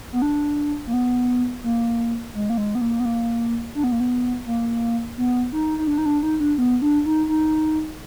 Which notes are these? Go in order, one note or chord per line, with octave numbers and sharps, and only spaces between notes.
B3
D4
A#3
B3
A#3
G#3
A#3
G#3
B3
A#3
B3
A#3
D4
B3
A#3
B3
A#3
B3
D#4
D#4
D4
D#4
D4
D#4
D4
B3
D4
D#4
D#4